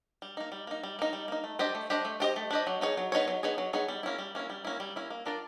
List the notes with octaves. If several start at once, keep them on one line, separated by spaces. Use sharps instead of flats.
G3
A#3 D#4
G3
A#3 D#4
G3
A#3 D#4
G3
A#3 D#4
A3
D4 G4 C5 D#5
A3
D4 G4 C5 D#5
A3
D4 G4 C5 D#5
A3
D4 G4 C5 D#5
F#3
B3 D#4 G#4 C#5
F#3
B3 D#4 G#4 C#5
F#3
B3 D#4 G#4 C#5
F#3
B3 D#4 G#4 C#5
G3
A#3 C#4 E4
G3
A#3 C#4 E4
G3
A#3 C#4 E4
G3
A#3 C#4 E4
A#3
D4 F4 A#4 D5